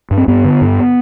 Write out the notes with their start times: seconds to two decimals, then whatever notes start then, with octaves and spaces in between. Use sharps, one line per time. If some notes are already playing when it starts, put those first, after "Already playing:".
0.11 G2
0.18 C4
0.28 G2 B3
0.45 D3
0.62 G2